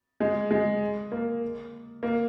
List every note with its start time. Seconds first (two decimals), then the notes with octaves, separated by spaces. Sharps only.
0.20 G#3
0.51 G#3
1.12 A#3
2.03 A#3